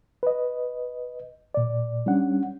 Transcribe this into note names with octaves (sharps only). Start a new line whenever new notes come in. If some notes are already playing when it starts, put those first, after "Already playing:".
B4 D#5
A#2 D5
G3 C#4 D4 F#5